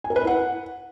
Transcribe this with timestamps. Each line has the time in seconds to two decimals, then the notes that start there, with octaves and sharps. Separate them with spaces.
0.04 G#5
0.10 A#4
0.16 B4
0.22 E4
0.27 F#5